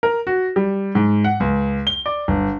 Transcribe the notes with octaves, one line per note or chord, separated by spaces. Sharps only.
A#4
F#4
G3
G#2
F#5
C#2
G7
D5
G1